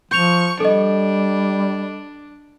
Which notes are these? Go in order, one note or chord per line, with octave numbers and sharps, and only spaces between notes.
F3 C#6 G6 F7
G3 D4 A4 D#5